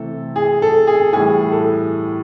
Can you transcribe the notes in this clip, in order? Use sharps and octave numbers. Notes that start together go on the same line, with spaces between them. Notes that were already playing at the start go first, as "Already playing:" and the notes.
Already playing: C3 E3 A3 A4
G#4
A4
G#4
A2 E3 G3 G#4
A4